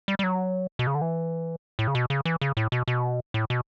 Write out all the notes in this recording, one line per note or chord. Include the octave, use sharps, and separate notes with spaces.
G3
G3
F#3
B2
C#3
D3
E3
A2
C#3
B2
C#3
E3
C#3
A2
B2
B2
A2
B2